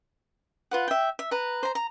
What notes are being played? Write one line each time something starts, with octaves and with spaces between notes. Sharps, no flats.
F4 B4 F#5
E5 G5
E5
B4 A#5
C5 A#5
A#5